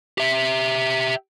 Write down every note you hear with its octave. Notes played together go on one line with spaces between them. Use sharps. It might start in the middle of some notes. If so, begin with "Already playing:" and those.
G4 E5